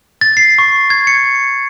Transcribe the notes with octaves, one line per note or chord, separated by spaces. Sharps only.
A6
C7
C#6
G#6
C#7